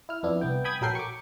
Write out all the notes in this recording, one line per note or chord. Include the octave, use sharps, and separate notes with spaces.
E4 F6
F2 B3 D4 E4
C2 B3 G5
G5 G#5 B5 D#6 G#6
A#1 F#3 A4 A#4 G5 C7
C#6 D6